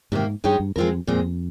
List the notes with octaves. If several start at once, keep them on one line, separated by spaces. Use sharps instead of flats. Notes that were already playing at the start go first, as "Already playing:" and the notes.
G#2 C3 D#3 A#3
G2 G#3 D#4 G4 C#5
G2
F2 G#3 C4 F4 A#4
F2 A#2 G#3 C4